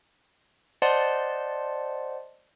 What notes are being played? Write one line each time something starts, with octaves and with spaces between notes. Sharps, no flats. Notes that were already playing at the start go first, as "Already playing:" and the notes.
C5 D5 D#5 F#5 A5 C6